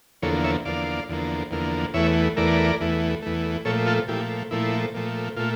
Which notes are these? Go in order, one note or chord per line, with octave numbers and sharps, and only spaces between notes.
E2 D3 F3 A#3 A4 C#5
C#5 E5
E2 D3 F3 A#3 D5 F5
E2 D3 F3 A#3
E2 D3 F3 A#3
E2 E3 A3 C#5 E5
E2 E3 A3 A#4 D5
E2 E3 A3
E2 E3 A3
A#2 F3 A3 A4 C#5
F4 A4
A#2 F3 A3 E4 G4
A#2 F3 A3 E4
A#2 F3 A3
A#2 A3 F4